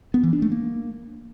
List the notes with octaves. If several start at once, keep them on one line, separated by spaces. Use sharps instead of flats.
B3
E3
D4
A3
A#3